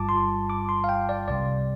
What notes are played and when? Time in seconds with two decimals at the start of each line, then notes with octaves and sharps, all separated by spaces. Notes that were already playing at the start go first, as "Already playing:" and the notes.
Already playing: G1 G2 G3 F4 A5 D6
0.09 C6
0.50 D6
0.69 C6
0.84 F5
0.89 G5
1.09 D5
1.28 C2 C3 G3 D5